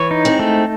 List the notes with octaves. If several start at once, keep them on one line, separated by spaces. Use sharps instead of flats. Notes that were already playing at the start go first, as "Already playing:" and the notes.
Already playing: E3 C#5
D#4
G#3 C4
A3